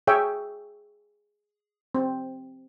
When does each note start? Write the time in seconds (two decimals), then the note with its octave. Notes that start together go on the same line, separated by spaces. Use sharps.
0.07 G#4 C#5 E5 G5
1.95 C4